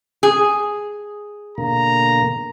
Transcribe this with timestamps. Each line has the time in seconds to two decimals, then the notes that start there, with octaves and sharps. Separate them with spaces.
0.23 G#4
1.58 B2 D3 A#3 A#5